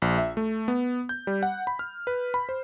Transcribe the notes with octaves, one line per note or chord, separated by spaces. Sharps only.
A#1
E5
A3
B3
G6
G3
F#5
B5
F6
B4
B5
C5